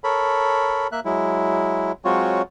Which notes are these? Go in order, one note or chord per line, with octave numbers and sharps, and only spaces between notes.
A4 A#4 C#5 B5
A#3 E5 F#6
F#3 G#3 E4
F#3 G#3 C4 F4 F#4 C#5